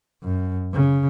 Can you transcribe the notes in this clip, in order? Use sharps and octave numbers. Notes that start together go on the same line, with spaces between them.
F#2
C#3